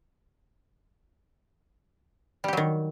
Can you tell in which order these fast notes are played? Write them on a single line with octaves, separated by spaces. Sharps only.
G3 G4 F#3 D#3